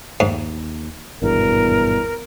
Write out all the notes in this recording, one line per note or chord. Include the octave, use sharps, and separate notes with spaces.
D#2 G#2
G#1 E2 G2 B2 A#4